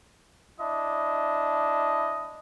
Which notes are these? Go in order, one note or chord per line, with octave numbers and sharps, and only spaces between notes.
D4 E4 D#5